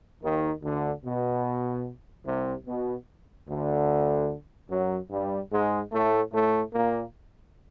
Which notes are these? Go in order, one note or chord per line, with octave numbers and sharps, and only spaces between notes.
D#2 D#3
D2 D3
B2
C2 C3
B2
D2 D3
F#2 F#3
G2 G3
G#2 G#3
A2 A3
A2 A3
A#2 A#3